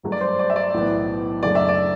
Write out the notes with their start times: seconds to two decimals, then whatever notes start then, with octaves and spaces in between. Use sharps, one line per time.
0.03 G1 G2 F#3 A3
0.12 D5
0.21 C5
0.39 D5
0.50 E5
0.56 D5
0.74 B1 A2 E3 B3
1.43 F#1 F#2 D3 A3 D5
1.55 E5
1.69 D5